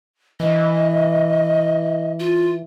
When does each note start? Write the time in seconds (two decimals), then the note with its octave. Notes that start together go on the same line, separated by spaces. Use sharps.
0.40 E3 D#5
2.20 F4